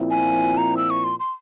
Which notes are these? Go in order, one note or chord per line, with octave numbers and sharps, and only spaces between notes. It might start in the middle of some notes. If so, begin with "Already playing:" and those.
Already playing: A#2 F3 C4 E4
G#5
A#5
E6
C#6
C6
C6